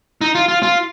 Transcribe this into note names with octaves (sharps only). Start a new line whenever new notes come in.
D#4
F4
F4
F4